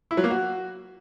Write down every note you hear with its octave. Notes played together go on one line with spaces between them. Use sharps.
E4
F#3
A#3
F#4